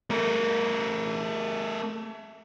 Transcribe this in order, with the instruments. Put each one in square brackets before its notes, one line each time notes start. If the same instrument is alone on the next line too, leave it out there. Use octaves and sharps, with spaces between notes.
[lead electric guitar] A3 A#4